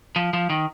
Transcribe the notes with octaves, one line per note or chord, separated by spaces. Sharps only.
F3
F3
D#3